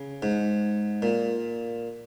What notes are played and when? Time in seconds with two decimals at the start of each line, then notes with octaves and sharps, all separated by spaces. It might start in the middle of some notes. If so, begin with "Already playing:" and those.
Already playing: C#3
0.22 G#2
1.02 A#2